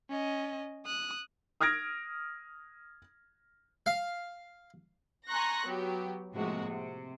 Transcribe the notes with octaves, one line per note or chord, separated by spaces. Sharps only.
C#4 D#5
D#6 F#6
D#6 F6 G#6 A#6 D7
F5
G#5 A#5 C6 C#6 F#6 A#6
F#3 B3 G4
A2 C3 F3 G#3 A#3 F#4
C3